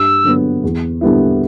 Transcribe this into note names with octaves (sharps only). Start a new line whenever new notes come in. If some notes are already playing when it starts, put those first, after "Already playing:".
Already playing: G2 E6
D3 F#3 B3
E2
D3 G3 B3 E4